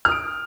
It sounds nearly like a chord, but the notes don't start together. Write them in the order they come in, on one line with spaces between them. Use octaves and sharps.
F6 D#6 D7